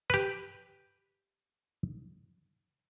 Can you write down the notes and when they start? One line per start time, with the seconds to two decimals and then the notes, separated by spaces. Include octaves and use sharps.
0.10 G4 B4